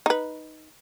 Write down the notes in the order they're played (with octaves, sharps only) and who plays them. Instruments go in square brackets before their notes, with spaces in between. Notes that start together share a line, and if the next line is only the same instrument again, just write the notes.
[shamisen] D#4 B4